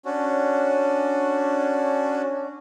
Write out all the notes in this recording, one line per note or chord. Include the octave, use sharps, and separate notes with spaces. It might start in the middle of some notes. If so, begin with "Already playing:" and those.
C#4 D4 F#4